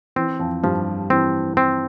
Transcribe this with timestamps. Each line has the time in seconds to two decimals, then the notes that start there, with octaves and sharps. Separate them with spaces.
0.16 E3 C4
0.39 F2 F3
0.63 G2 F3 G3
1.10 E3 C4
1.57 C4